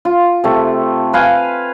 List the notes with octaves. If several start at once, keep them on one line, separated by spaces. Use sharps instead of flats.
F4
C3 A3
B4 F5 G#5